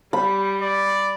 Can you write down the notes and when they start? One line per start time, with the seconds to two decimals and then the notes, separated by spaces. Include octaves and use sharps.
0.13 G3 B5
0.62 D5